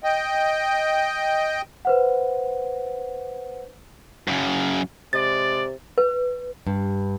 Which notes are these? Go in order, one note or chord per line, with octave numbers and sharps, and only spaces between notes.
D#5 G5
B4 C5 F#5
F#2 C#3
C3 G#3 D5 A6
B4
G2